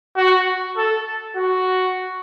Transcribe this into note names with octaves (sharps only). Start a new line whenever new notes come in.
F#4
A4
F#4